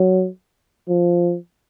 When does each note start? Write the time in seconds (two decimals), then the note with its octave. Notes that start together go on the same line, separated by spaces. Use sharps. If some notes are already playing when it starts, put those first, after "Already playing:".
Already playing: F#3
0.88 F3